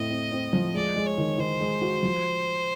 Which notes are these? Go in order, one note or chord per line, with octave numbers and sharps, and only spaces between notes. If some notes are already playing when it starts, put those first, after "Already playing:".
Already playing: A2 C4 D#5
C4
C4
F3
G#3 D5
G#3
C#5
D#3
D#3 C5
G#3
F#4
F3